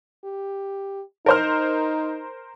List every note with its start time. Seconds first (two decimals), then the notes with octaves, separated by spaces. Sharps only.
0.24 G4
1.26 D#4 A#4 C5 F6